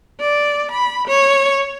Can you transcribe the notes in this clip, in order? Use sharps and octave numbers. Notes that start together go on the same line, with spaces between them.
D5
B5
C#5